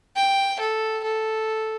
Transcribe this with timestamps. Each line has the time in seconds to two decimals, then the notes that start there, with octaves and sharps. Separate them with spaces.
0.16 G5
0.60 A4
1.04 A4